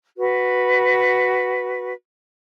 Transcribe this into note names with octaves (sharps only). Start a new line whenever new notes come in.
F#4 B4